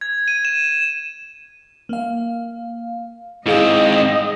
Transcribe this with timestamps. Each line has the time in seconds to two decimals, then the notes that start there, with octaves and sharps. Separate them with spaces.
0.01 G#6
0.28 D#7
0.45 E7
1.89 A#3 F5
3.46 G#2 C4 E4 G#4 D#5 F5